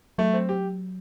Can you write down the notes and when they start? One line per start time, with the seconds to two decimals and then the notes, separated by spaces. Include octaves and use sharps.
0.18 F#3 A3
0.33 C4
0.49 G4